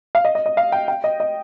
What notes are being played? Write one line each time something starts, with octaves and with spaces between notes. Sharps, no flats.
F5
D#5
D#5
D#5
F5
G5
G5
D#5
D#5